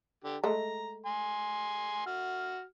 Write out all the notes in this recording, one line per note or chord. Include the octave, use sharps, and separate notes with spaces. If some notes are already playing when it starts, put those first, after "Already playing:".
D3 G4
G#3 A3 A#5
G#5 C6
F#4 F6